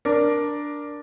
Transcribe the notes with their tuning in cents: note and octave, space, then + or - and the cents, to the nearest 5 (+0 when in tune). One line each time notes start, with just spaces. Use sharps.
D4 +0 A#4 +10